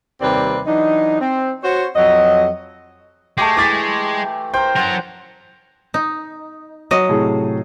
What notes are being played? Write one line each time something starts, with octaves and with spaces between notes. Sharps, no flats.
D#2 C3 G3 C4 B4 D5
E3 F#3 D4 D#4
C4
F#4 C5 C#5
F2 F#3 D#5
G#3 A3 G4 A5 D6
E3 D6 A6 B6
A#4 C5 G5
F#3 A#4 C5 F#5 A5
D#4
F#3 D#5
A2 C3 G#4